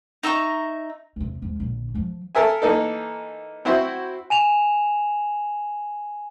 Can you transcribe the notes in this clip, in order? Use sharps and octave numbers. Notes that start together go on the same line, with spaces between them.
D#4 E5 A#5 C#6
E2 C3
D#2 G#2
A#1 D3
E3 F3
A4 A#4 E5 G#5
E3 A#3 D#4 A4
C4 E4 F#4 C5 E5
G#5 E7 F7